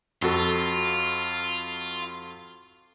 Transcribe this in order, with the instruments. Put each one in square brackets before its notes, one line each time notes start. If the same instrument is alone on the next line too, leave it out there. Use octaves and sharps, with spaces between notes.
[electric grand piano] F2 F#4 A4 [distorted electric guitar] F4